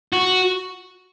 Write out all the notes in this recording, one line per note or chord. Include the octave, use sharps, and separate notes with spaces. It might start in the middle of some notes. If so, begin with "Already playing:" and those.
F#4